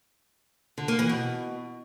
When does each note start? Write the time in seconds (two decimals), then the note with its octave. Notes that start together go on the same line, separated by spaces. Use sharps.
0.78 D3
0.88 A#3
0.99 E3
1.09 B2